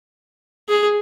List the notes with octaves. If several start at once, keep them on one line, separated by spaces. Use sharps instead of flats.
G#4